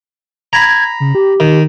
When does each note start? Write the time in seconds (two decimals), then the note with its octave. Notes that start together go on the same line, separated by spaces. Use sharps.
0.53 A#5 B5 G#6
1.00 C#3
1.15 G4
1.40 D#3